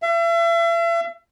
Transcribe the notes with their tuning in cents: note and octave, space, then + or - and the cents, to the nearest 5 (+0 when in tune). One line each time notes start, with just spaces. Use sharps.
E5 +40